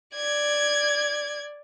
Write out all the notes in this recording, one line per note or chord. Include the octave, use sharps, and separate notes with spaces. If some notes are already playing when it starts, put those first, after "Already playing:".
D5 G#6